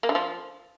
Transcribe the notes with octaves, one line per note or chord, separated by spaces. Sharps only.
A#3
D3
F3